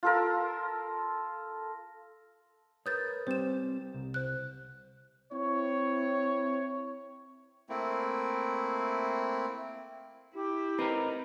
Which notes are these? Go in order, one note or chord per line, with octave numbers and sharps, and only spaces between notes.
F4 A4 A#4
A#4 B4 C#5 D#6 G6 A6
G3 C4 C5 E7
C2
C5 F#6
C4 E4 C#5
A3 A#3 C4 E4
E4 G4
C4 D#4 A#4 B4